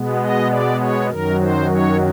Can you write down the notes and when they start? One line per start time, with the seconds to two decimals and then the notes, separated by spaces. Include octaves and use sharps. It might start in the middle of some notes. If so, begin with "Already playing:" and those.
Already playing: B2 G#3 B3
0.21 D#5
0.50 D5
0.80 C#5
1.10 F#2 D#3 F#3 A#4
1.40 C5
1.70 C#5